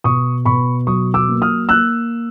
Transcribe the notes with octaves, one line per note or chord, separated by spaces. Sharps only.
B2 C#6 D#6
B2 B5 C#6
F#3 C#6 D#6
D6 E6
A#3
D#6 F6
A#3 E6 F#6